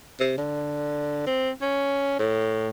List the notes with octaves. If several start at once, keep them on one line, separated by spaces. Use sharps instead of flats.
C3
D3
C4
C#4
A2